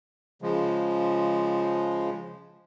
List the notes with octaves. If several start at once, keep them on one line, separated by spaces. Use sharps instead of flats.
C#3 F3 G#3